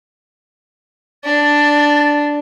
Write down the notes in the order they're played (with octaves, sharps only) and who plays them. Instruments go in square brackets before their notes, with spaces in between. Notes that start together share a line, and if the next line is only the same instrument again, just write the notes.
[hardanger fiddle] D4 [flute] A6